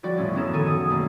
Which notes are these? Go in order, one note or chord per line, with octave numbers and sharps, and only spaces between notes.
F3 G3 F#4 D5
E1 A2 A3 C#4 D5
F#1 F#2 B3 C#4 A#4 E7
D#3 A4 G#5 C#7 D#7
F#5 D#6
B2 G3 A3 A#3 C4 C#4